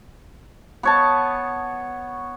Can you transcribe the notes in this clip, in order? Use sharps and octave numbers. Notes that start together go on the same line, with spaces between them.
B3 C#5 A5